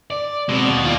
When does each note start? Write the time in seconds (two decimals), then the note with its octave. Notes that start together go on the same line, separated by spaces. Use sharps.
0.11 D5
0.49 B2 G#3 C4
0.68 D#2
0.85 F4 D5